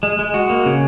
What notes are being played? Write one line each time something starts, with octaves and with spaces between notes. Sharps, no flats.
G#3
G#3
F#4
A#3
C#3